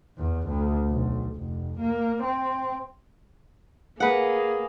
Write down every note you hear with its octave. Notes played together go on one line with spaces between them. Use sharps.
E2
D2
B1
F1
A#3
C4
A#3 G#4 B4 F#5